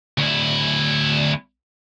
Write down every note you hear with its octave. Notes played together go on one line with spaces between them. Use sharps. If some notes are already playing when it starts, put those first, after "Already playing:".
D2 E4